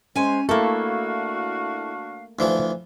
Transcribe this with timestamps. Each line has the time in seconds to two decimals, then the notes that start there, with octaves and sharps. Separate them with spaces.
0.15 G#3 C#4 C5 G#5
0.49 A3 A#3 D4 E4 F#4 A4 F5
2.39 D2 E3 F3